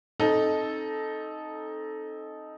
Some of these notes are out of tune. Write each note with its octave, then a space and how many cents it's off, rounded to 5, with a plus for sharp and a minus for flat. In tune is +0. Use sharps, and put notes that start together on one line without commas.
C4 +35 D#4 +0 A4 -15